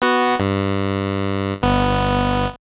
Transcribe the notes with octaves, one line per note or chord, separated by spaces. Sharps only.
B3 F#4
G2
G1 B3